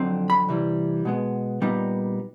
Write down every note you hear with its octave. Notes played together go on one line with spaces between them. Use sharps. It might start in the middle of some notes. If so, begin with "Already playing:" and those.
Already playing: F2 D3 F#3 C4
B5
C3 E3 G3
B2 G#3 B3
A#2 G3 B3 D#4